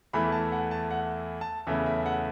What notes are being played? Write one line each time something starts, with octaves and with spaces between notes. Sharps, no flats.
E2 E3 A3 E4 B5
A5
F#5
A5
F#5
A5
E2 C#3 A3 E4 E5
E5
F#5